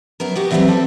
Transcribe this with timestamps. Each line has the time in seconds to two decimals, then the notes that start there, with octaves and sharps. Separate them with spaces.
0.20 F#2 B3 A#4
0.36 B3 F#4 G4
0.51 D3 E3 F#3 G3 B3 C4
0.68 G3 C4 A4